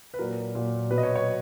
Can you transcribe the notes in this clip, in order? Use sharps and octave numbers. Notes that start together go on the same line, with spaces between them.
B4
A#2 F#3 A#4
A#2 F#3
B2 F#3 B4
D#5
C#5
C#5